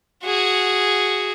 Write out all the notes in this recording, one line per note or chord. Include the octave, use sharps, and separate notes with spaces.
F#4 G#4